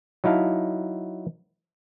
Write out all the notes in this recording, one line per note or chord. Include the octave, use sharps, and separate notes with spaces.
F#3 D#4 E4 F5 A5